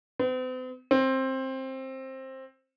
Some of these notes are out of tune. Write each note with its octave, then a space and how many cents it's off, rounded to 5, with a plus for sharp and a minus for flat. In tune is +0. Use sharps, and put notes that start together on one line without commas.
C4 -45
C4 +15